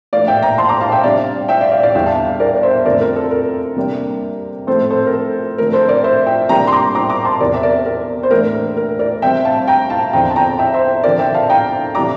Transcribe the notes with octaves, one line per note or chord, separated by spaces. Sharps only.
A2 F3 A#3 D4 D5 F5
E5 G5
G5 A#5
A5 C6
A#5 D6
F5 A5
E5 G5
C3 G3 D4 D5 F5
E5 G5
D5 F5
D5 F5
D5 F5
E2 D3 G3 D4 E5 G5
F5 A5
A#4 D5
D5
C5 E5
F2 D3 A3 C4 A#4 D5
A#4
A4
A#4
C3 G3 A#3 D4
A2 F3 C4 A4 C5
A4 C5
A#4
A4
D3 F3 A3 C4 A#4
A4 C5
A#4 D5
C5 E5
E5 G5
C3 G3 A#3 D4 G5 A#5
C6
A#5 D6
A#5 D6
A#5 D6
A5 C6
E2 C3 E3 A#4 D5
E5
A#4 D5
A#4
C5
A2 E3 A#3 D4 A#4
A#4
A#4
A#4 D5
C3 G3 C4 E5 G5
F5 A5
G5 A#5
F5 A5
E2 D3 F3 C4 G5 A#5
A5
G5 A#5
E5 G5
C5 E5
D3 F3 C4 A#4 D5
E5 G5
F5 A5
G5 A#5
C3 E3 G3 D4 A#5 D6